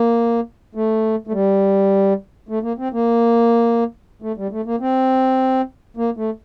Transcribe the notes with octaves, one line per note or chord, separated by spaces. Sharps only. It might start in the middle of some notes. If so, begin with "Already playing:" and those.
Already playing: A#3
A3
A3
G3
A3
A#3
C4
A#3
A3
G3
A3
A#3
C4
A#3
A3